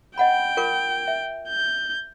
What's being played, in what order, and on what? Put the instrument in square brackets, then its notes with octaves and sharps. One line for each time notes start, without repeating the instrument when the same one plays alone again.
[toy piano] D#5 F#5 B5 [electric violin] G5
[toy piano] F4 A#4 D6
E5
[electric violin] G6